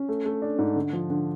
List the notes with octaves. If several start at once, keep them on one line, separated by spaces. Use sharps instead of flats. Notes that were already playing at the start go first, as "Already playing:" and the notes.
Already playing: C#4
A3
A3
D4
G#2
D3
F3
D3